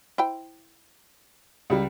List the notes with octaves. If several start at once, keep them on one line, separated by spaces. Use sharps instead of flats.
E4 C5 G5
C#2 G3